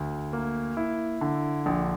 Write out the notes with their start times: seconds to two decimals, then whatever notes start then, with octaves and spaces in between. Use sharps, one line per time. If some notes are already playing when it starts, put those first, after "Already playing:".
Already playing: D2
0.33 A#3
0.77 E4
1.21 D3
1.66 A#1